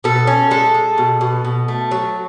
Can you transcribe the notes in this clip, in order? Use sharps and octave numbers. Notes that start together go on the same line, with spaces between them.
B2 A4
C#4
G#3 A4
G#3
B2
B2
B2
A3
F#3